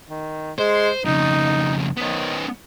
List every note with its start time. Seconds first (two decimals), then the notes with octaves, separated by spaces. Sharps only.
0.09 D#3
0.59 G#3 C5
1.05 F2 C#3 D#4
1.97 D#3 B3 C#4